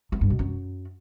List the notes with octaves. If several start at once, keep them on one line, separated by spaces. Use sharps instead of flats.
E3
G2
B2
F#2